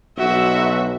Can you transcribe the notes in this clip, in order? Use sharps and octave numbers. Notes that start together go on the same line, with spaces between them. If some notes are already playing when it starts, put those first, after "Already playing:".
B1 F#4 E5